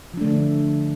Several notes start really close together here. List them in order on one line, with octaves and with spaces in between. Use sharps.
F3 D4 A3 D3